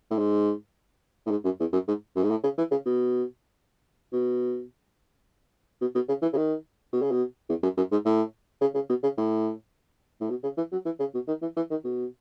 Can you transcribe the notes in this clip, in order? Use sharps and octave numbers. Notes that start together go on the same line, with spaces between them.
A2
G#2
A2
G#2
F#2
E2
F#2
G#2
F#2
G#2
A2
C#3
E3
C#3
B2
B2
B2
B2
C#3
E3
C#3
D#3
B2
C#3
B2
E2
F#2
F#2
G#2
A2
C#3
C#3
B2
C#3
A2
A2
B2
C#3
E3
F#3
E3
C#3
B2
D#3
E3
E3
D#3
B2